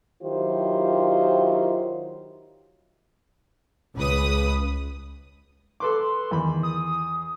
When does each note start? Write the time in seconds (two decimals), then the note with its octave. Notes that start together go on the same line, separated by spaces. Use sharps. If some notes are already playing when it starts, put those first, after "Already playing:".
0.22 D#3 F#3 E4 F4 G4 C5
3.96 C#2 B4 D#6
5.80 A4 B4 C6 D6
6.31 E2 D#3 B5
6.63 D#6